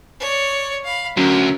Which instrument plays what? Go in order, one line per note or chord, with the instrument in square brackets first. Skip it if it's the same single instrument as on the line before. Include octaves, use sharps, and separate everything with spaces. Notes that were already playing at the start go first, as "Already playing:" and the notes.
[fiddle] C#5 D5
F5 B5
[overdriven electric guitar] D2 D3 [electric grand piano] F#3 C#4 [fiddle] A#4